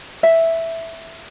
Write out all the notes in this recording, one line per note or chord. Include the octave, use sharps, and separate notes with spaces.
E5